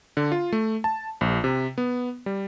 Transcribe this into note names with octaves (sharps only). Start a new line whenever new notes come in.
D3
F4
A3
A5
A#1
C3
B3
G3